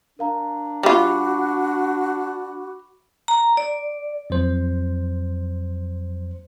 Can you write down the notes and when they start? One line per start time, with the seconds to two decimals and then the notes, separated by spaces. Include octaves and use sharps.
0.19 D4 A#4 F5 A#5
0.83 G3 F4 F#4 B5 C#6 D6
3.28 A#5
3.57 D5
4.30 F2 F#3 C5